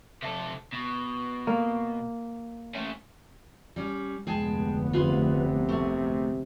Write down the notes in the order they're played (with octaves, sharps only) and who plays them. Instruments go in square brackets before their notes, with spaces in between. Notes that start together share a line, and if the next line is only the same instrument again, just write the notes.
[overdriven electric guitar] C3 A4
B2
[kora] A#3
[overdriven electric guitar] A3 C#4
[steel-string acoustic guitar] G3 C#4
[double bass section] F1 D2 B3 [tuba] G#3 [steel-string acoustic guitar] G#4 G5 A5
[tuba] C3 [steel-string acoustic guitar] F4 G#4 B4
[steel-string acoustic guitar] A3 G#4